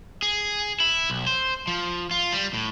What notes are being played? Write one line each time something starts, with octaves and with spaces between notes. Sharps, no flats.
G#4
E4
B1
C5
F3
F4
G3
A2